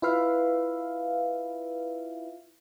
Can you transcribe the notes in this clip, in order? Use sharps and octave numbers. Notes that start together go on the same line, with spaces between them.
E4 F4 B4 E5 F5